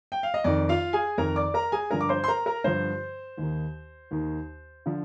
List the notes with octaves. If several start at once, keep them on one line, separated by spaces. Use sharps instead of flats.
G5
F5
D#5
F2 D#3 D5
F4 F5
G#4 G#5
F2 D#3 A#4 A#5
D5 D6
A#4 A#5
G#4 G#5
G2 D3 F3 A#4 A#5
D6
C5 C6
C6
A#4 A#5
A#4 A#5
G2 D3 F3 C5
D#2 D#3
D#2 D#3
D3 F3